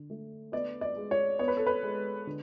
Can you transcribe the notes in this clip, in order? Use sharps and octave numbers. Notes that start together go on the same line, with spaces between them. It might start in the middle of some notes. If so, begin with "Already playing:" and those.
Already playing: D3
A3
B3 D5
D5
G#3
C#5
B3 C#5
B4
A4
B4
G#3
D3